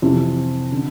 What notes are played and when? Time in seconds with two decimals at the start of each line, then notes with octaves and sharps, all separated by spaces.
0.02 F2 C3 E3
0.72 D3